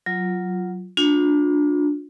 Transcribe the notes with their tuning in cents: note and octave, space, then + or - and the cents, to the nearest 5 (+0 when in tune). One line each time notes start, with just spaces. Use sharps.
F#3 +0 F4 +0
D4 +0 F4 +40